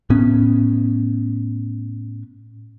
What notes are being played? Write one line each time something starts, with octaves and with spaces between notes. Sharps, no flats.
A2 B3 C#4